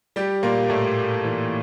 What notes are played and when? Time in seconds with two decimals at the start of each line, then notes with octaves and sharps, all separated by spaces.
0.16 G3 G4
0.43 A#2 A#3
0.70 A2 A3
1.24 E3